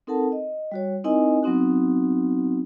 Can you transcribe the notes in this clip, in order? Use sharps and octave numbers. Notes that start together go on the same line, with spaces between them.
C4 D#4 A4 A#4 F#5 A5
D#5
G3 F#4 C#5
C4 D#4 E4 A#4 D#5 G#5
F#3 B3 C4 D#4 F#4